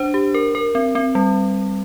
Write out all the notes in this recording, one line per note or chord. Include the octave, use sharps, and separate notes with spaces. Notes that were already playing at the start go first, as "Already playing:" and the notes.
Already playing: D4 C5
G4
A#4
A#4
C4
C4
G3